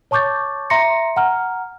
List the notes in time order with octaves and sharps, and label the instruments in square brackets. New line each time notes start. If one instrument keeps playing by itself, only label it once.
[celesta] C#5 A5 C#6 D6 G6 A6
E5 A#5 C6 A#6 C#7
F#5 A#5 F6